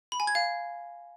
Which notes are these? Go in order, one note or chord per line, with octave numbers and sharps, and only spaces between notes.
B5
G#5
G#6
F5